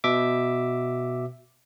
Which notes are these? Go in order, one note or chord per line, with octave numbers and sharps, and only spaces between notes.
B2 E5 D6